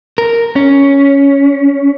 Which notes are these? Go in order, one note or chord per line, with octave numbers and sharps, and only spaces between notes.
A#4
C#4